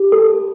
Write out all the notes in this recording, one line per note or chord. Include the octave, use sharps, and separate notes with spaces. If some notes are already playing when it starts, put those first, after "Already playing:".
Already playing: G4
A4